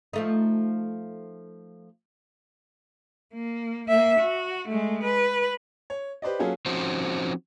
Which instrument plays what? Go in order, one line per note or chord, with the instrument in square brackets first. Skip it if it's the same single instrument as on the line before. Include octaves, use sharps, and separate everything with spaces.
[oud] F3 A3 D#4
[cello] A#3
A#3 E5
F#4
G#3 A3
B4
[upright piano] C#5
G4 B4 C5 D5 D#5
F#3 A#3 C#4 F4 G#4 A4
[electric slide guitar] F3 C4 C#4 D#4 F#4 C5